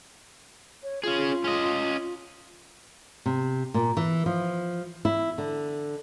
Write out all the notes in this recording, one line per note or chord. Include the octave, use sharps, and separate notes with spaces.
C#5
C#4 F4 G#4
C#4 D#5
C3
A#2
E3
F3
E4
D3